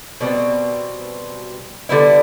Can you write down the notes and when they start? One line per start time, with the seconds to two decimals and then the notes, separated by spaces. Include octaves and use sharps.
0.21 B2 G3 C4
1.89 D3 G3 B3 E4